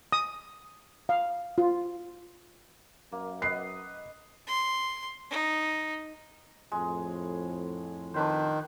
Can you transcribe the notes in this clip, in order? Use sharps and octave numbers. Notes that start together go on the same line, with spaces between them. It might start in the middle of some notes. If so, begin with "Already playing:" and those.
D#6
F5
F4
F#2 A#3
B4 D#5 F#5 C7
C6
D#4
F2 A2 G#3
D#3 D4 B4 C5